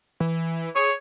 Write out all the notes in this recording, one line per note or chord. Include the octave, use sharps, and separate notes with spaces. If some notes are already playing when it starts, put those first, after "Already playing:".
E3
G#4 C#5